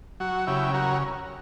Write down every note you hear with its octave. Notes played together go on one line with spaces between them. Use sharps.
F#3 F#4
C#3 E4 G4
F#3 F#4 A#4